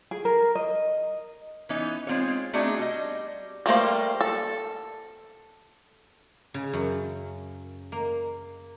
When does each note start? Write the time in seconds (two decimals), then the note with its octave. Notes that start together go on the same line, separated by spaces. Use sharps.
0.11 G#4
0.25 A#4
0.55 D#5
1.69 E3 B3 C#4 D#4
2.07 G#3 C4 F4 C#5
2.53 A3 C4 D4 D#4 F#4 G#4
2.79 G3 D#5
3.66 G3 A3 A#3 C5
4.21 A4
6.54 C#3
6.73 F#2
7.92 A#3